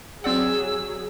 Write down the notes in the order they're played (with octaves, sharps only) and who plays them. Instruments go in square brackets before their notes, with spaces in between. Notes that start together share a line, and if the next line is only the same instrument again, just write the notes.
[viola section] F#3 G#4 [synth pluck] C4 D5 F#5 [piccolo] E6